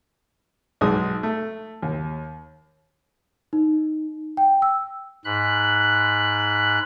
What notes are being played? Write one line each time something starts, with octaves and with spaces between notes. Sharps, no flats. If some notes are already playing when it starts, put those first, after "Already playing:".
B1 G#2 G#3 D#6
A3
D#2
D#4
G5
E6
G#2 B5 F#6